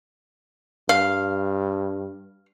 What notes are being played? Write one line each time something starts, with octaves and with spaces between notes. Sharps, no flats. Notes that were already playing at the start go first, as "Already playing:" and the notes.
G2 F5